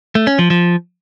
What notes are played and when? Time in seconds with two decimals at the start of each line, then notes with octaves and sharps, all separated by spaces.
0.15 A3
0.27 C#4
0.39 F3
0.50 F3